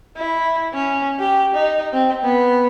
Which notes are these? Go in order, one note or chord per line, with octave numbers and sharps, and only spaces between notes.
E4
C#4
G4
D#4
C4
B3